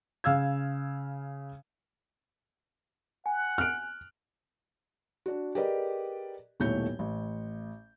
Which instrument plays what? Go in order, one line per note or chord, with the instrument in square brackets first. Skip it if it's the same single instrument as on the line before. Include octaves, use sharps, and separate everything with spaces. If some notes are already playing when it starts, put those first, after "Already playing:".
[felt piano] C#3 F5 E6 G#6
[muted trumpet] F#5 [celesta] G#5
[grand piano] F6 D7 [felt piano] F#6
[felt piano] D4 F#4
G4 G#4 A#4 B4 D5 D#5
D#1 B1 A3 E4 C#5 G6
A1